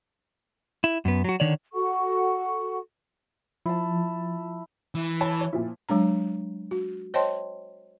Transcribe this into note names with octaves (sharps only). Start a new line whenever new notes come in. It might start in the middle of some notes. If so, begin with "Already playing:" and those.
E4
F#2 B3
F#3 F#4
D3 D#3 C#5 D5
F#4 A4 F#5 C#6
F3 E4 A5
E3
C#5 A5 B5
C#5
A#2 F3 E4
F#3 G#3 D4 A#5
F#4
C5 C#5 D#5 G5 A5 C6